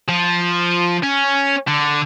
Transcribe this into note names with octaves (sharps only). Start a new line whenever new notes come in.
F3
C#4
D3